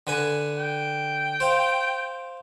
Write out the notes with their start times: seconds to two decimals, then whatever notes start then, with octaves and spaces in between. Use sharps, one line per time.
0.07 D3 B4 G#5
0.58 G5
1.40 C5 F5